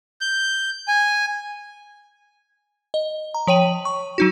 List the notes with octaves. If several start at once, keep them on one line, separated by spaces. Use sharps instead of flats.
G6
G#5
D#5
A#5
F3 C#5 G5 D#7 F#7
C#6
F#3 D#4 F#4